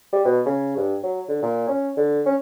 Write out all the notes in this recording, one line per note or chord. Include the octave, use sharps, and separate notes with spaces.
G3
B2
C#3
G2
F#3
D3
A#2
C#4
D3
C#4